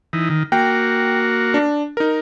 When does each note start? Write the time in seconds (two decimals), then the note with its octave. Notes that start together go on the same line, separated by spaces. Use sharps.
0.13 E3 D#4
0.30 D#3
0.52 A#3 F#4 G5
1.54 D4
1.97 D#4 A#4